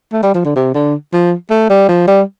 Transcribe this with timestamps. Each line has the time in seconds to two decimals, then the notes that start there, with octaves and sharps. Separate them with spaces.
0.13 A3
0.23 G3
0.34 F3
0.45 D3
0.56 C3
0.74 D3
1.13 F3
1.50 A3
1.70 G3
1.89 F3
2.08 G3